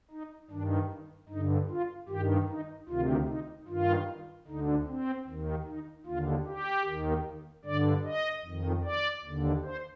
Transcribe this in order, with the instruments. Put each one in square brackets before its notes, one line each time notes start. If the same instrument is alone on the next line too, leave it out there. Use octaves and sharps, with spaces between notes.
[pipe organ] D#4
G2 D#3 D4
G2 D#4
D3
F4
G2 D#3 G4
D#4
D2 C3 D#3 F4
D#4
G2 D#3 F4
D2 D3 D#4
C4
D#2 D#3
D#4
D#2 D3 F4
G4
D#2 D#3
G2 D3 D5
D#5
F2 D#3
D5
D#2 D3
C5